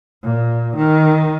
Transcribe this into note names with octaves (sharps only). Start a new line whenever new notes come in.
A#2
D#3